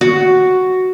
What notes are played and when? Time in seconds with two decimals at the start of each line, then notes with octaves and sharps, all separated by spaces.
0.01 F#4